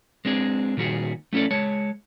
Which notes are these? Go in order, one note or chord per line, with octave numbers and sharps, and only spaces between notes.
G#3 C4 D4 G#4
A#2 D#3 G3 F#4 G#4
A3 C#4 E4 A4 D5
G#3 C#5 A5